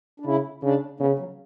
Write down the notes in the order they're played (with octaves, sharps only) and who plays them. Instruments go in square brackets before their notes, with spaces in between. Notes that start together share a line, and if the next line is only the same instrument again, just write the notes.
[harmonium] D4
[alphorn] C#3 [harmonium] E4
[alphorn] C#3 [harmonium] D4
[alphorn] C#3 [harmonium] B3
[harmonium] F#3